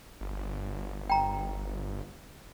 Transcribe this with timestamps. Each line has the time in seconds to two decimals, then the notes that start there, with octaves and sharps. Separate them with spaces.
0.21 G1
1.10 G5 A#5